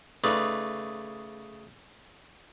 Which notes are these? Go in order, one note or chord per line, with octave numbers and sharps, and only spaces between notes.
C#3 A3 D#4 B4 D5